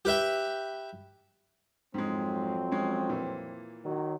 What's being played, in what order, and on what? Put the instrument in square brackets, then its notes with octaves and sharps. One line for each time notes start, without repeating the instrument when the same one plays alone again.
[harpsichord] G4 B4 E5 G5
[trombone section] F2 F#3 C4 [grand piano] G#2 G#3
[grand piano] G#3 C#4
A#2 E3
[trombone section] D#3 F#3